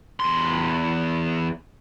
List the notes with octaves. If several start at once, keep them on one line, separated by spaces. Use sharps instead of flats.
E2 C6